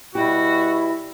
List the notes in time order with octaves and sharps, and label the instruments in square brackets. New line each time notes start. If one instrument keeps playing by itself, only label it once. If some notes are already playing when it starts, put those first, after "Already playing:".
[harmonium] B2 G3 [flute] E4 [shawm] F#4 [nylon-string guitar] G4